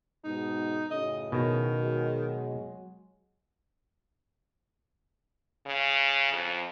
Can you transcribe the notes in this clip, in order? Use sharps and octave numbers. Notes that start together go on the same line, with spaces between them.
G#2 B2 G#3 D#4
F#2 A2 C#3 D#5
B2 D#3
F#3 G#3 F#4
C#3
F2